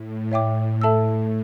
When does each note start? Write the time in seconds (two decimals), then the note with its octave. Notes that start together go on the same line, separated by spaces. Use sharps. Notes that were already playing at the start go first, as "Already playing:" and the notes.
Already playing: A2
0.31 C#5 E5 G5 D6
0.82 A4 E5 A5 E6